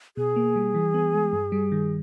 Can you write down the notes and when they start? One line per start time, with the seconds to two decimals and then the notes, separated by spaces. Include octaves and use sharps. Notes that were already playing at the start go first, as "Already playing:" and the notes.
0.17 B2 G#4
0.36 A#3
0.56 G3
0.75 E3
0.94 B3
1.13 G#3
1.33 G2
1.52 G3
1.72 D#3